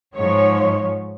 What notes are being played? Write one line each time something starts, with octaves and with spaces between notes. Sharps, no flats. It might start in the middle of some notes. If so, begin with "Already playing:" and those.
G#2 F3 C#5